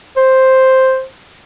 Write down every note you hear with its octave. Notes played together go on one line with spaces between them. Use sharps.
C5